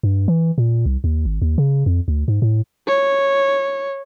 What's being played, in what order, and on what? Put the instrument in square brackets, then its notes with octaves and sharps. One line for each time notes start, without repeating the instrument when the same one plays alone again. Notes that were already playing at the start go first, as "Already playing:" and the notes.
[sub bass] G2
E3
A#2
C2
D#2
G#1
D#2
C#3
F2
D2
G#2
A2
[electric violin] C#5